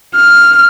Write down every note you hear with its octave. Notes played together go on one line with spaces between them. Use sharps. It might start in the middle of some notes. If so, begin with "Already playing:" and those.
F6